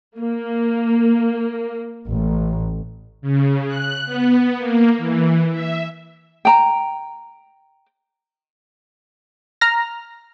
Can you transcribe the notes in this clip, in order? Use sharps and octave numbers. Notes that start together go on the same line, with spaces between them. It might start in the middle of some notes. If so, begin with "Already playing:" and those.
A#3
A1
C#3
F#6
B3
A#3
E3
E5
G5 A#5
A#5 F6 A#6